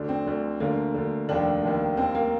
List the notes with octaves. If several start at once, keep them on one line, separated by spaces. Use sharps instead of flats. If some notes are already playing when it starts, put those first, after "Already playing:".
Already playing: D2 D3 D4
C4
D2 D3
D2 D3 A#3
D2 D3
F1 D#2 D#3 D4
F1 D#2 D#3
D#2 D#3 C4
A#3